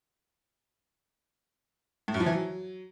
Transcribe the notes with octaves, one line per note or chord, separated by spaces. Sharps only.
A2
F#2
F3
E3
F#3